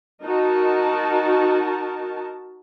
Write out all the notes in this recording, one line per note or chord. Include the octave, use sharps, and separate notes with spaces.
D#4 F#4 A#4 A5